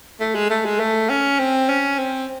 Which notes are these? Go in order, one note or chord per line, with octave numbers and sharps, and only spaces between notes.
A3
G#3
A3
G#3
A3
C#4
C4
C#4
C4